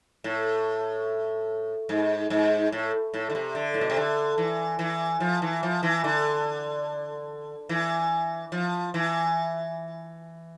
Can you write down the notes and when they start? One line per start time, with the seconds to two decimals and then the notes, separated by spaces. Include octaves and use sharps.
0.24 A2
1.89 G#2
2.30 G#2
2.72 A2
3.14 A2
3.30 D3
3.35 C3
3.55 D3
3.74 A2
3.81 B2
3.90 C3
3.97 D3
4.38 E3
4.79 E3
5.20 F3
5.42 E3
5.63 F3
5.83 E3
6.04 D3
7.69 E3
8.52 F3
8.94 E3